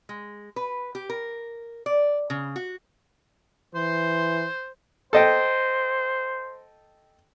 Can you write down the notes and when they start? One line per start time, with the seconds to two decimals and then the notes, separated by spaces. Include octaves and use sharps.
0.09 G#3
0.56 B4
0.95 G4
1.10 A#4
1.86 D5
2.30 C#3
2.56 F#4
3.75 E3 C5 C6
5.13 A4 C5 D#5 G5